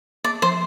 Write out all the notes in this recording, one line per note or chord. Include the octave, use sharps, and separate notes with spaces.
A#3 D5
F3 C5